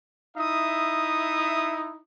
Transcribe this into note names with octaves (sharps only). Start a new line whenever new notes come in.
D#4 E4 E5 D#6